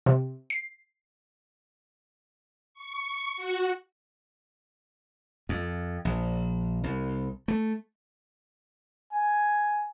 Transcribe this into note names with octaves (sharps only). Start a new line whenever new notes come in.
C3
C7
C#6
F#4
F2
A#1
C2
A3
G#5